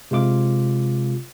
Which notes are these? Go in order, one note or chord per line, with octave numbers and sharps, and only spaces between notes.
C3 G#3 F4 D6